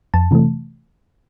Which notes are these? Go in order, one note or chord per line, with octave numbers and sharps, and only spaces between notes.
F2 A5
C3 E3 A3